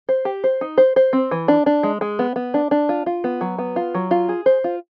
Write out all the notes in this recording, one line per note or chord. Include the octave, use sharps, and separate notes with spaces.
C5
G4
C5
D#4
C5
C5
C4
E3
D4
D4
G#3
G#3
B3
B3
D4
D4
F4
F4
B3
F#3
B3
F4
F#3
F4
G#4
C5
F4